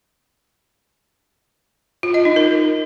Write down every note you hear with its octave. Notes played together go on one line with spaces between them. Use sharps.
F4
D#5
D#4
A#4